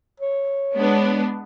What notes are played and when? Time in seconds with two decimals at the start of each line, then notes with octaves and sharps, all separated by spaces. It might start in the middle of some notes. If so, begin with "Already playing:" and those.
0.20 C#5
0.77 G#3 B3 D4